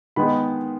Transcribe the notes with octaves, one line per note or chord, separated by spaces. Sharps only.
D#3 G#3 B3 B5